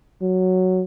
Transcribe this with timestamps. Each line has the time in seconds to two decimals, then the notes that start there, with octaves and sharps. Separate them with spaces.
0.22 F#3